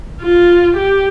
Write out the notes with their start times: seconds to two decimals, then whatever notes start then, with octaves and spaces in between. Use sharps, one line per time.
0.21 F4
0.77 G4